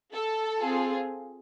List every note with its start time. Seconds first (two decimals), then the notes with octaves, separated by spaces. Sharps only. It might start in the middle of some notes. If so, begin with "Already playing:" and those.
0.13 A4
0.61 C4 F4 G#4